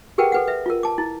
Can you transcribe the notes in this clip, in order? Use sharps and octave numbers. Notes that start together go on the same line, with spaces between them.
G4 G#4 A#4 B4 F#5 G5
A4 B4 F#5
B4 E5
F4 A#4
A5 D6
E4